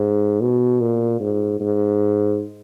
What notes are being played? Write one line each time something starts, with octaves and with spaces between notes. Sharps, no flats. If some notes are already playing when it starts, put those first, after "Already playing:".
Already playing: G#2
B2
A#2
G#2
G#2